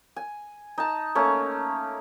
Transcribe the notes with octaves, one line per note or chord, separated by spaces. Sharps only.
G#5
D#4 A5
A3 A#3 C#4